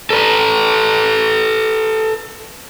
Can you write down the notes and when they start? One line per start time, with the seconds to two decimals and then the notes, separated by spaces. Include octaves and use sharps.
0.10 A4 B4